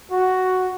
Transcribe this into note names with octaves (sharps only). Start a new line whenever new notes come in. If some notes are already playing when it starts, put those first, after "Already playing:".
F#4